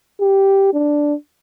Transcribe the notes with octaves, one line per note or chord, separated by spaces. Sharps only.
G4
D4